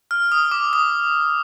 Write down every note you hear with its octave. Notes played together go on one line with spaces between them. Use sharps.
F6
D#6
D6
D#6